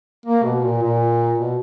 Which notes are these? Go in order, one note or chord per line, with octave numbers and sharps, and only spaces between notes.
A#3
B2
A#2
A#2
B2